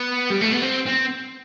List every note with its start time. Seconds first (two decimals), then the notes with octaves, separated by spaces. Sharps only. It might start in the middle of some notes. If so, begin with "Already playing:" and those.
Already playing: B3
0.30 G3
0.41 A3
0.52 B3
0.62 C4
0.87 C4